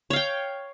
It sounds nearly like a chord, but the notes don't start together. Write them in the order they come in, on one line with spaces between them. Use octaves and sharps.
C#5 F5 G5